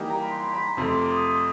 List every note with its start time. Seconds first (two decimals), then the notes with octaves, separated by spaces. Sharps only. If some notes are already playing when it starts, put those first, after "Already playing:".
Already playing: E3 G3 A#3 D#4 G4 G5
0.09 A#5
0.21 B5
0.30 C6
0.43 B5
0.54 B5
0.66 A#5
0.77 F2 C3 F3 A3 C6
0.89 D6
1.00 D6
1.12 D#6